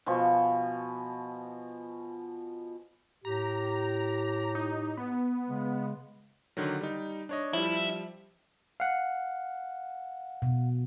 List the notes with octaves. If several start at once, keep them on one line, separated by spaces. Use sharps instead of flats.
B2 F3 G#5 C#6
A2 G4 A#5
D#4
B3
C#3 G#3
D3 D#3 F#3
G3 D#4
D4 C#5 D#5
F3 G3 E4
F5 F#5
B2